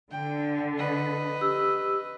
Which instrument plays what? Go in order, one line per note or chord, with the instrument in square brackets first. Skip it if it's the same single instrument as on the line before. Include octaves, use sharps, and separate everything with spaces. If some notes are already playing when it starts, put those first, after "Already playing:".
[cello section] D3 [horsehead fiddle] G5
[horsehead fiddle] B4 D#5
[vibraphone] G4 E6